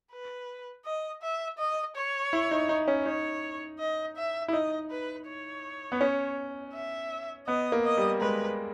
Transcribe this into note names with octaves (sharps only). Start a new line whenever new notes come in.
B4
D#5
E5
D#5
C#5
E4
D#4
D#4
C#4
D#4 C#5
D#5
E5
E4
D#4 D#5
B4
C#5
B3
C#4
E5
B3 D#5
A#3
D#5
G3
G#3 B4